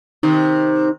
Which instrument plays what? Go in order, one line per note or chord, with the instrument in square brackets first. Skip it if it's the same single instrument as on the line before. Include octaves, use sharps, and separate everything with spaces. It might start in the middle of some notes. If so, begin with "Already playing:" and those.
[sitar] C3 D#3 [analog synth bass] D#4